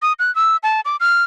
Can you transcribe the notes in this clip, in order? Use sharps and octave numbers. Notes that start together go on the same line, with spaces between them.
D#6
F#6
E6
A5
D6
F6